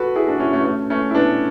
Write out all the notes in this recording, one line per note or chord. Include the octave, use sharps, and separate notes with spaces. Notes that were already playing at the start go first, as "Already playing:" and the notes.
Already playing: F#4 A4 B4
E4 G#4
D4 F#4
C#4 E4
A3 C#4
A3 C#4
A3 C#4
E4
B3 D4